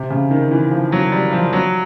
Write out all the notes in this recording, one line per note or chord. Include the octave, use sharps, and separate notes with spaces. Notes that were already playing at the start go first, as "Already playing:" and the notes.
Already playing: C3
C#3
D#3
E3
F3
F#3
G3
F3
F#3